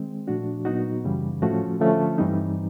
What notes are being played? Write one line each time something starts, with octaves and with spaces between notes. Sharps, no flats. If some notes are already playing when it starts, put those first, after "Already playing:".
Already playing: D#3 G#3 C4
A#2 F3 A3 D4 F#4
A#2 F#3 B3 D#4 F#4
F#2 C#3 E3 G3
A2 F3 A3 C#4 F#4
D3 F3 A3 C#4
G2 E3 G3 C4 D#4